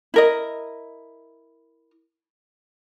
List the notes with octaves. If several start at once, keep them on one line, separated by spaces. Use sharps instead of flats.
E4 A#4 D#5